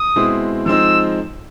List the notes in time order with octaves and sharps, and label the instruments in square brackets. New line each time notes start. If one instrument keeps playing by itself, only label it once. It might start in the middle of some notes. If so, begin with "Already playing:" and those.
Already playing: [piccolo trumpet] D#6
[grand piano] B2 G#3 C4 E4
[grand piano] F3 G#3 C4 D#4 [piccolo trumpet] E6